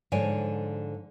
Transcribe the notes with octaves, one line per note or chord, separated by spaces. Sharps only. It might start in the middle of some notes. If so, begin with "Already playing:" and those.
G#2 D3 F3 C#5 D5 G#5